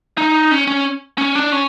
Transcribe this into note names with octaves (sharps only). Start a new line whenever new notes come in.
D#4
C#4
C#4
C#4
D4
C#4